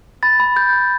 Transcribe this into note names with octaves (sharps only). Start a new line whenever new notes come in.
B5 A6
B5
G6
B5